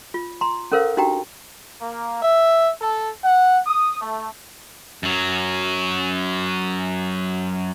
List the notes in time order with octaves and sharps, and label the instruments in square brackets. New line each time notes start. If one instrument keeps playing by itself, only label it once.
[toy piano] F4
A#5 C6
C#4 A4 A#4 C5 F5
D4 D#4 F#4 G4 G5 A#5
[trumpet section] A#3
E5
A4
F#5
D#6
A3
[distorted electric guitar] F#2 F#3